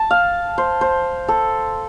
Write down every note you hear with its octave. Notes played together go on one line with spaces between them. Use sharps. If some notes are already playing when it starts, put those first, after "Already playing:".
Already playing: A5
F5
C5
C5
A4